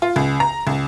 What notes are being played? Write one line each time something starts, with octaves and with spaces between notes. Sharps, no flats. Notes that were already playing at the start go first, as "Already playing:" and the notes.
F4
C#2
A#5
C#2